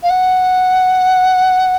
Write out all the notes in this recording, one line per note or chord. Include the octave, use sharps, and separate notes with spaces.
F5
F#5